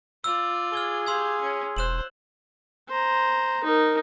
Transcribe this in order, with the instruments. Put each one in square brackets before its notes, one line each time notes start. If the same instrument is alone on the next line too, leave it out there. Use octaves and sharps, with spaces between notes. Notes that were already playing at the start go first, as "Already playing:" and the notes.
[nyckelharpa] F4 D5 [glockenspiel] E6
[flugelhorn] G#4 [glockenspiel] F6 G#6 G7
[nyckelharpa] G4 F5 [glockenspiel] C6 E6 G#6
[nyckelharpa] C#4
[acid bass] E1 [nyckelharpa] C5 [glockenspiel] F#6 E7 F#7
[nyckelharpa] C5 A#5
D#4 A#4